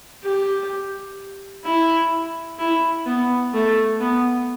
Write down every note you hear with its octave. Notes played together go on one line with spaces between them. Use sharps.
G4
E4
E4
B3
A3
B3